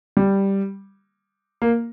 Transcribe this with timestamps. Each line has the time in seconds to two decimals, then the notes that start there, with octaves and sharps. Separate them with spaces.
0.17 G3
1.62 A#3